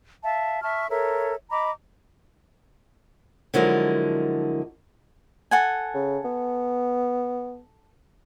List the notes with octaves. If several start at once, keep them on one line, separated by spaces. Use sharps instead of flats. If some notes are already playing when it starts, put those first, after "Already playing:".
E5 F5 A5
E5 A5 C#6 F6
A4 A#4 C#5 E5
D#5 A#5 B5 D6
D3 F3 F#3 G#3 E4 A#4
A4 F#5 G#5
C#3
B3